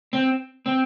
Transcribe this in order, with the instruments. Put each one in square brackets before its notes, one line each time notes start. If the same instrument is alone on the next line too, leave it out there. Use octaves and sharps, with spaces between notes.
[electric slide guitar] C4
C4